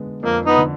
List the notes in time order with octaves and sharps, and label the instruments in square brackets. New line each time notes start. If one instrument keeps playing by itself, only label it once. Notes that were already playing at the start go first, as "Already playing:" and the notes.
Already playing: [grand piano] D3 G#3 B3
[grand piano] F2 [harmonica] A#3
[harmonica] B3 D#4
[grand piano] D3